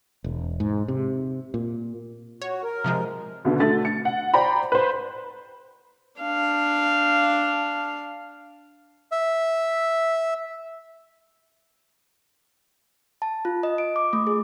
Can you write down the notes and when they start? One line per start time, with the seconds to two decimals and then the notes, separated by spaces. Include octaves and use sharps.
0.24 E1
0.60 G#2
0.88 C3
1.54 A#2
2.42 F#4 C#5
2.63 A#4
2.84 C3 F3 G#3
3.45 D2 B2 D3
3.60 D3 A3 A6
3.85 C#7
4.05 F#5
4.34 C5 D5 G5 A#5 B5
4.72 B4 C5
6.21 D4 F5
9.12 E5
13.22 A5
13.45 F4
13.63 D#5
13.78 D7
13.96 D6
14.13 A3
14.27 G#4